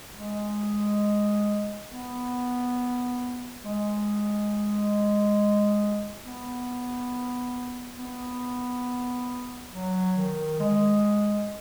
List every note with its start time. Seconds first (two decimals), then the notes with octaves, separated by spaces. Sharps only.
0.16 G#3
1.91 B3
3.64 G#3
6.25 B3
7.98 B3
9.72 F#3
10.16 D#3
10.60 G#3